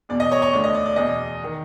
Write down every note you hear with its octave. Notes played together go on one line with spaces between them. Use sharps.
E2 B2 D5
D#5
C#5
C#5
D2 D3 D5
D#5
D5
D5
E2 B2 D#5
D#3